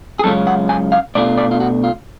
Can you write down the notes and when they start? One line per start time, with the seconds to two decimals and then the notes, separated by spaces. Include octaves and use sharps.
0.19 G#4
0.24 F#2 C#3 G#3 C#4 F4 A4
0.47 F#5
0.69 G#5
0.92 F5
1.15 B2 A3 D4 F4 D5
1.38 D5
1.51 F4
1.60 F#4
1.84 F4